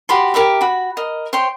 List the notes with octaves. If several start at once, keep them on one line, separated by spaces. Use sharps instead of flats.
F#4 G4 B5 C6
G4 A#4 E5 B5
F#4 B5
A#4 D#5
C5 C#5 G5 C6